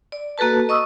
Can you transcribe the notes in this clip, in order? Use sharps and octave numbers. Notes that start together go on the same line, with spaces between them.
D5
A#3 F#4 A4 B4 A5
D#5 C#6 D#6 E6